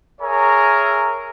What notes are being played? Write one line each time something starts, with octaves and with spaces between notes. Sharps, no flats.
G#4 A#4 C#5 E5 G#5 A#5